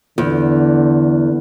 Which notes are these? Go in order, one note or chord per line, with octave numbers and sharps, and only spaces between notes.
E2 D3